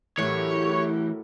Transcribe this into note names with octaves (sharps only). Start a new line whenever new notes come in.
A2 E3 F#3 A3 E4 G4 A#4 C#5